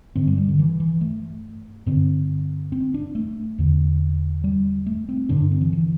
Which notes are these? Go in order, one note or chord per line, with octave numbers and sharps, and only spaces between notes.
G2 D3 C4
G3
G3
D3
E3
E3
A3
G2 D3 C4
C4
D4
A3
E2 D3
G3
A3
C4
G2 D3 D4
D4
C4
E3
E3